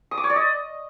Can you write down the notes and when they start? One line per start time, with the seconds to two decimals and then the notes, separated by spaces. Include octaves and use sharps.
0.11 D#6
0.17 D6
0.24 C#5
0.30 D5
0.36 D#5